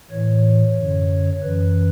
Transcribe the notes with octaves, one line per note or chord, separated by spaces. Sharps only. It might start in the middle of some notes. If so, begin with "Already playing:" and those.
A2 E3 C#5
F#2 D3
F#2 E3 B4